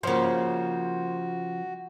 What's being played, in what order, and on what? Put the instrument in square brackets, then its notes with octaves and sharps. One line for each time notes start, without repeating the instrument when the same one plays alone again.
[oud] C#3 F3 [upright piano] A#3 C5 [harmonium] F#4